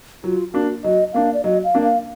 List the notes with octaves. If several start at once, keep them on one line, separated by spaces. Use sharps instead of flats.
F#3 F4
A#3 D4 F#4
F#3 D#5
A#3 D4 F5
D5
F#3 D#5
F5
A#3 D4
F5